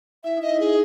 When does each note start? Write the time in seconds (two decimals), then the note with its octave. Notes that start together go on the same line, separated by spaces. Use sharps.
0.24 E4 E5
0.37 D#4
0.42 D#5
0.51 E4
0.60 D#4 G#4